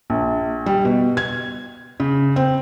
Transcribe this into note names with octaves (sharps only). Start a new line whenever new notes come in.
A#1
G3
B2
G#6
C#3
C4